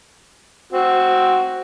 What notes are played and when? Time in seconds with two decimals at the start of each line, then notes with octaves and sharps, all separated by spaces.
0.73 C4 F#4